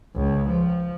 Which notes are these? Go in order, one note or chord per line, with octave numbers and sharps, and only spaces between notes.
C#2
F3